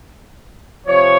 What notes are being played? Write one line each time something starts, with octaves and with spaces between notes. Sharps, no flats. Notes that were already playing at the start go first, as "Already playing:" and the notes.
C3 F3 C#5